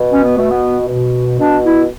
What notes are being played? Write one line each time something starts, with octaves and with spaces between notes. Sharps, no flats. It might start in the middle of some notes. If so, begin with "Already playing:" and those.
Already playing: B2
C#4
B3
B2 A3
B3
B2
B2 D4
E4